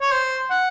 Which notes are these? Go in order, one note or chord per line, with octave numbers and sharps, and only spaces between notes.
C#5
C5
F#5